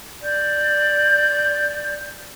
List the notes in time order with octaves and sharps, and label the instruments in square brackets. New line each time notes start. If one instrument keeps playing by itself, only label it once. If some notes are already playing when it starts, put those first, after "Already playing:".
[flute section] D5 G6